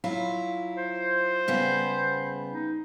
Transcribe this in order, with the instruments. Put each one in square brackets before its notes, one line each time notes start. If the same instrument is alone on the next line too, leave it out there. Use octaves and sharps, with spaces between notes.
[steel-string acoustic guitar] F#3 E4 F4
[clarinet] C5
[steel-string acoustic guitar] C#3 G3 B3
[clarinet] D#4